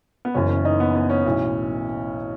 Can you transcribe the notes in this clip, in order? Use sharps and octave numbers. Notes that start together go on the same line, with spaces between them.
B3
F#1 F#2 E3 C#4
C#4
D#4
B3
B3
C#4
B1 A2 E3